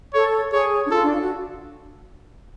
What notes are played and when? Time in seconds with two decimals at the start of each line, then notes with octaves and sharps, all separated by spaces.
0.13 A4 C#5
0.52 G#4 C#5
0.86 D4
0.91 F4 A4
1.01 D4
1.10 F4
1.20 F#4